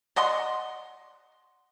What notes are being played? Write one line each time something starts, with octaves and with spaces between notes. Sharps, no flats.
D5 D#5 F#5 C6